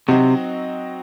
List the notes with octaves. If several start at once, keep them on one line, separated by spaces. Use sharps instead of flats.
C3 F#3 C4 D#4 F#4